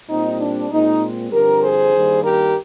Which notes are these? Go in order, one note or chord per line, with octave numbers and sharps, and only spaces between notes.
A#2 G3 C4 D#4
D4
A#2 G#3 C4 D#4
G2 D3 F3 C4 G4 A#4
G#4 C5
G2 D#3 G3 A#3
G4 A#4